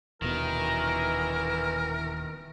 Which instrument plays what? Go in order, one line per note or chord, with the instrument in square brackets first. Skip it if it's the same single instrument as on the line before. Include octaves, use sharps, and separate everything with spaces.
[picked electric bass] D#1 B2 [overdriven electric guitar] D#3 [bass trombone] E3 [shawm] A#4